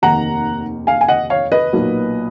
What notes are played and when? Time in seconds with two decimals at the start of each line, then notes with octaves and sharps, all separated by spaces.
0.02 F1 D#2 D#3 A#3 F#5 A#5
0.87 F5 G#5
1.01 G#5
1.08 D#5 F#5
1.30 C#5 F5
1.52 B4 D#5
1.73 B1 A#2 F#3 A#3